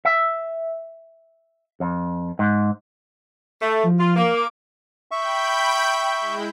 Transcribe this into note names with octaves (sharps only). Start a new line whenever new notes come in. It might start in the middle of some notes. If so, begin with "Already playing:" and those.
E5
F2
G#2
A3
F3
F4
A#3
D6
E5 G5 B5 C#6 G6
G#3 E4